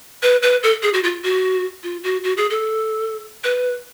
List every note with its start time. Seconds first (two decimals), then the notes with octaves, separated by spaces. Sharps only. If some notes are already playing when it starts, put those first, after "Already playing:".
0.23 B4
0.42 B4
0.63 A4
0.83 G#4
0.93 F#4
1.03 F4
1.23 F#4
1.83 F4
2.04 F#4
2.24 F#4
2.37 G#4
2.50 A4
3.44 B4